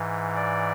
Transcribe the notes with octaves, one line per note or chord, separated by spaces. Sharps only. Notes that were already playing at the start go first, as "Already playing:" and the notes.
Already playing: G#2 E3
D5